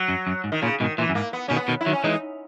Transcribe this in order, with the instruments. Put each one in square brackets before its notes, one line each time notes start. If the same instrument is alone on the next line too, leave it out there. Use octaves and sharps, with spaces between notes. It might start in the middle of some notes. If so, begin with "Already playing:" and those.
Already playing: [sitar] F#3
[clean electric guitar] F#2
F#2
G#2
[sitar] D#3
[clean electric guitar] A#2 [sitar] C#3
[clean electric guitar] G#2 B2 [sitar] D#3
[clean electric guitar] A#2 [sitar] E3
[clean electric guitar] F#2
[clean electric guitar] G#2 [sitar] A#3
[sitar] B3
[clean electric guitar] B2 D#3 [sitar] C#4
[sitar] B3
[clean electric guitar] B2 D#3
[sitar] E4
[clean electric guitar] D#3 F#3
[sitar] C#4
[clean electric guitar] E3 G#3 [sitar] D#4